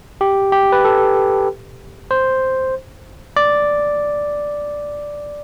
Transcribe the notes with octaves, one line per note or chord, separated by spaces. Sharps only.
G4
G4
B4
A4
C5
D5